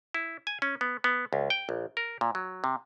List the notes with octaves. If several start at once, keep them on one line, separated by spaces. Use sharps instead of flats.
E4
G#5
C#4
B3
B3
C#2
G5
A#1
A#4
A#2
F#3
C3